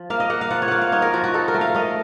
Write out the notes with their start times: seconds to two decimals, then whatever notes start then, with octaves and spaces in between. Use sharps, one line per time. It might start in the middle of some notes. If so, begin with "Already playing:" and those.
Already playing: F3
0.10 A#3 F5
0.20 D#5
0.30 A#3 F#5
0.41 F5
0.50 F3 F#5
0.62 C#5
0.68 A#3 F5 F#5
0.82 F5
0.92 D#4 C#5
1.02 A#4
1.13 F3 F#4
1.24 F#4
1.34 D#4 A4
1.48 A#4
1.54 A3
1.61 F5
1.74 A3 D#5